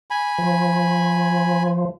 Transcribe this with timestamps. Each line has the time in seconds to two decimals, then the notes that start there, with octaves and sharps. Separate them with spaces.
0.10 G#5 B5
0.38 F3